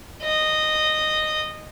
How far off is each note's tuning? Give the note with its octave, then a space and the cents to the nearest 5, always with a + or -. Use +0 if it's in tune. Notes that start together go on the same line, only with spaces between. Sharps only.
D#5 -10